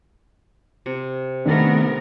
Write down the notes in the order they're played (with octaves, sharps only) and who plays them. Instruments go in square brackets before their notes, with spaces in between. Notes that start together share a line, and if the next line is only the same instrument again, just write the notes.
[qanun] C3
[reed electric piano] D#3 C4 D4 [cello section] A3 B3 A#4